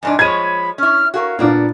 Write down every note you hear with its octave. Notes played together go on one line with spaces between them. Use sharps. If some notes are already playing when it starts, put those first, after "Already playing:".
F2 G#2 D4 G#5
F3 G#3 C#5 B5 G#6 D#7
C#4 E4 F6
F#4 G#4 A#4 F5
A#2 A#3 B3 D4 D5